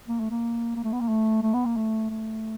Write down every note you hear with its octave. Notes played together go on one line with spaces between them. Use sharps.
A#3
A3
A#3
A#3
A3
B3
A#3
A3
A3
B3
A#3
A3
A3